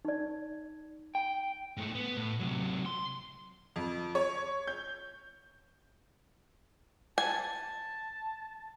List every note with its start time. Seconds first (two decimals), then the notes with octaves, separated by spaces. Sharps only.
0.05 D#4 D5
1.15 G5
1.77 G#2 A3
1.95 B3
2.17 A2
2.40 C3 F#3
2.86 C6
3.76 F2
4.15 C#5
4.67 G6
7.18 G#5 A5